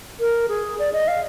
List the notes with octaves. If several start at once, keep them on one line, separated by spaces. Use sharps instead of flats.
A#4
G#4
D5
D#5
F5